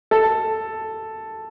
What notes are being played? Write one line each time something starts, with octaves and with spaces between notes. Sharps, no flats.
A4